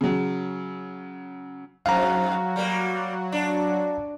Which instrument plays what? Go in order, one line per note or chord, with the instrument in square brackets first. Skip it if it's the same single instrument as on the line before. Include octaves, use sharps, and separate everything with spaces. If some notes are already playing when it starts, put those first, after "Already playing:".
[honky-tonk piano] C#3 F#3
[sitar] F2 G#2 [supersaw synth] F#3 F#4 [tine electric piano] F5 A#5
[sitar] G3 A#3
D4